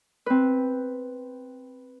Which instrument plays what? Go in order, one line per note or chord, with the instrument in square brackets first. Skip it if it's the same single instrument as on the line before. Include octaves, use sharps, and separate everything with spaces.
[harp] C4 B4